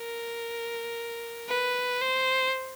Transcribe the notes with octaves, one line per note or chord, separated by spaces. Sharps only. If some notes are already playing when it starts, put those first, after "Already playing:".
Already playing: A#4
B4
C5